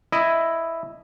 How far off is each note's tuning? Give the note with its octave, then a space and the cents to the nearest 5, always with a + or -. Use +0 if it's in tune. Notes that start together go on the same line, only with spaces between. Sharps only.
E4 +0 D#5 +0